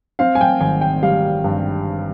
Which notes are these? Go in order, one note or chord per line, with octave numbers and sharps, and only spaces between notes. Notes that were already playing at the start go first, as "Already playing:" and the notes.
C4 F5
G#5
G5
G#1 G#5
G5
G3 F5
G2